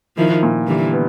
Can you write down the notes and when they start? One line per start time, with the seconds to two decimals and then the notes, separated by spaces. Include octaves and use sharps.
0.17 D#3 F3 E4
0.43 A#2
0.67 D3 E3 G3
0.93 B3